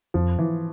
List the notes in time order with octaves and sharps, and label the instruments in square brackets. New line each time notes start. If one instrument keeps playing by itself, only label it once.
[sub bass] F2 [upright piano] F3
[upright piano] E3